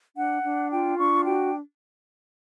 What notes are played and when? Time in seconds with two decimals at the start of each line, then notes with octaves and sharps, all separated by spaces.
0.16 D4 F#5
0.43 D4
0.71 F4 G5
0.98 D4 C#6
1.25 F#4 G5